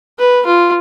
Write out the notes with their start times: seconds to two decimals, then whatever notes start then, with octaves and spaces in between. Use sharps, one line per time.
0.19 B4
0.46 F4